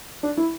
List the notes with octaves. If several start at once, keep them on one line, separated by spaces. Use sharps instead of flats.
D4
E4